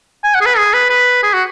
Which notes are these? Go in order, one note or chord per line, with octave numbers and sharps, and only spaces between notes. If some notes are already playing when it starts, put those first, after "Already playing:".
G#5
F#5
G#4
B4
G#4
B4
B4
G#4
F#4